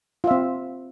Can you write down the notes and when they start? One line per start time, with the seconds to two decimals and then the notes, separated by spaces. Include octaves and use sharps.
0.24 F4
0.27 E5
0.31 C4